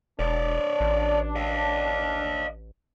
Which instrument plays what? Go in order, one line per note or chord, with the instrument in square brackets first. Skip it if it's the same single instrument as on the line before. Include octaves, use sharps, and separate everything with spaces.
[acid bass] E1 [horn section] D4 [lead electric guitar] C#5 D5
[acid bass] A1
[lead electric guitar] D#5 F5